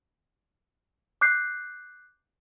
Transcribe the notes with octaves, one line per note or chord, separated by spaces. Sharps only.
D6 F#6 G6 C7